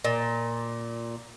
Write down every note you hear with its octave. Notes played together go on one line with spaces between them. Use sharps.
A#2